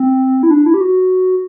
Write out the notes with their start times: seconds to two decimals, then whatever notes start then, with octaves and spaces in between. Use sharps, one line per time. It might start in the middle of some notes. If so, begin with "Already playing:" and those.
Already playing: C4
0.43 E4
0.51 D4
0.66 E4
0.74 G4
0.81 F#4